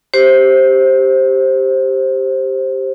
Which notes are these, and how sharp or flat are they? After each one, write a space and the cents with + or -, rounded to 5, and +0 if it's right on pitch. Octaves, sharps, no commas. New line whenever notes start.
G4 +0 C5 +10